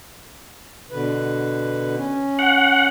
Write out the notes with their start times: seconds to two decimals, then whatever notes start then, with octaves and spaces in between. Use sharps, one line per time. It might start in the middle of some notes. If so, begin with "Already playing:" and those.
0.91 B2 D3 B4
1.97 C#4
2.39 F#5